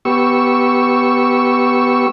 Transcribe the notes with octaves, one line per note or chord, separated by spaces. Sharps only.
B3 G4 C#6 E6